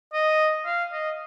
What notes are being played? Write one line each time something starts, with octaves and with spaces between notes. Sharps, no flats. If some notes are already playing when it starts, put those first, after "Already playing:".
D#5
F5
D#5